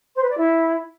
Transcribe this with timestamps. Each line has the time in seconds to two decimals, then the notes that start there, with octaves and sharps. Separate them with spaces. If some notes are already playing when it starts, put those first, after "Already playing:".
0.16 C5
0.23 B4
0.30 D5
0.37 E4